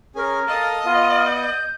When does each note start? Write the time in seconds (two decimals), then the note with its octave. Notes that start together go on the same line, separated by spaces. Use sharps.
0.16 C#4 G#4 A#4 G#5
0.48 A4 D#5 F5 A5
0.85 B3 F4
1.25 G6